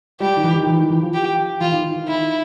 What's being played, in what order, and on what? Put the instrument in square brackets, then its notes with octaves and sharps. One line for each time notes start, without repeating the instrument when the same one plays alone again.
[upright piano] G3 [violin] G4
[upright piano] D#3
E3
D#3
E3
D#3
E3
F3
[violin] G4
[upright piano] E3 [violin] F4
[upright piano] D#3
D#3
D#3
[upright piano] D#3 [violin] E4